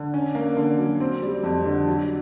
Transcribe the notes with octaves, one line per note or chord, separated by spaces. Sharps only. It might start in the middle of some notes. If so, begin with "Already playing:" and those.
Already playing: D3
C#4
A#3
D3
F#3
C4
G3
F2
D3
F#3